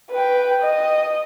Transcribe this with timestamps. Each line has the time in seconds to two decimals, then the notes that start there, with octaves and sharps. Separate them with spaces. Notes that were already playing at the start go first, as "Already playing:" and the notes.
0.11 B4 G5
0.61 D#5